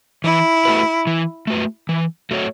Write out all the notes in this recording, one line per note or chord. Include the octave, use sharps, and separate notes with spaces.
E3 E4
A3 F#4 B4
E3
A3 F#4 B4
E3
A3 F#4 C#5